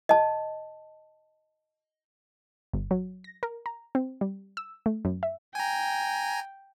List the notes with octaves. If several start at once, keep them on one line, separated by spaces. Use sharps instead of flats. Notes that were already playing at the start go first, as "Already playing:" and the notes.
D#5 A5
G1
F#3
A#6
A#4
A#5
C4
G3
E6
A3
F#2
E5
G5 G#5 A#5